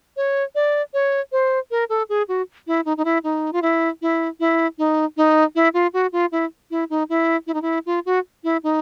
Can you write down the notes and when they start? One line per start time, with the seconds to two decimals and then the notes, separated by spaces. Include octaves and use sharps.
0.17 C#5
0.55 D5
0.94 C#5
1.32 C5
1.71 A#4
1.89 A4
2.09 G#4
2.28 F#4
2.67 E4
2.85 D#4
2.97 D#4
3.05 E4
3.24 D#4
3.53 F4
3.62 E4
4.02 E4
4.40 E4
4.78 D#4
5.17 D#4
5.55 E4
5.74 F4
5.93 F#4
6.12 F4
6.32 E4
6.71 E4
6.90 D#4
7.09 E4
7.47 E4
7.54 D#4
7.62 E4
7.86 F4
8.06 F#4
8.44 E4
8.63 D#4